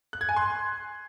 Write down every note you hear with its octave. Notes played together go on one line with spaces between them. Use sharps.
F#6
G#6
G#5
C6